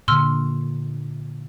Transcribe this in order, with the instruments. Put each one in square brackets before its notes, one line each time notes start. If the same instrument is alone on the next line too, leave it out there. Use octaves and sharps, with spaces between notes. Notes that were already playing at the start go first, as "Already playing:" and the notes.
[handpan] A#2 D3 [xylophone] C6 E6 F6